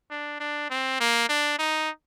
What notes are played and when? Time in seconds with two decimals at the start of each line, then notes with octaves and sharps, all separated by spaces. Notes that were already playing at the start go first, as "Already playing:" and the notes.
0.11 D4
0.40 D4
0.70 C4
1.00 A#3
1.29 D4
1.59 D#4